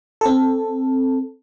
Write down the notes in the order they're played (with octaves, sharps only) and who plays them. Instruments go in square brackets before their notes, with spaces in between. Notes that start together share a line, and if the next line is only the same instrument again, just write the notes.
[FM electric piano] C4 A4